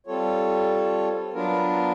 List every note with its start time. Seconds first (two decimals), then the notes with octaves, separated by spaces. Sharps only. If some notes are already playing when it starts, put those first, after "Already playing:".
0.07 G3 C4 F4 A4 C#5
1.33 F#3 B3 D4 F4 A#4